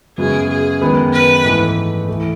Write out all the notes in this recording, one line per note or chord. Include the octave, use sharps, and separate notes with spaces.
F#2 C#3 G#3 B3 F#4 G#4
G#4
F#2 D#3 G#3 B3
B4
G#2 E3 A3
E3 A3